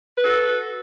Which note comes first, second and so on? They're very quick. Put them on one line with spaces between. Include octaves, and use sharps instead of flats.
B4 A4 F#4